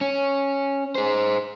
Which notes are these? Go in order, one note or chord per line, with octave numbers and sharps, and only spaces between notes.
C#4
G#4 C5